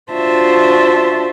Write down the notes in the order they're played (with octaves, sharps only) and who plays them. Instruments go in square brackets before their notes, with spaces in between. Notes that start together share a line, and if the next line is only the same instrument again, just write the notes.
[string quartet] D4 F4 F#4 C5 E5 A5